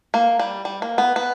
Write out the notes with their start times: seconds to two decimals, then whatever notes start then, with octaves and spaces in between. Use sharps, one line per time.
0.14 A#3
0.39 G3
0.65 G3
0.82 A#3
0.98 B3
1.16 B3